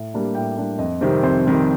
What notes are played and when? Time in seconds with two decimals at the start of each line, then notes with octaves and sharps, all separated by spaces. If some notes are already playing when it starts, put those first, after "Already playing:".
Already playing: A2
0.14 G3 A#3 D4
0.35 A2 G5
0.57 G3 A#3 D4
0.79 F2 D#5
1.01 C3 D#3 G3 C4
1.23 F2 C5
1.45 C3 D#3 G3 C4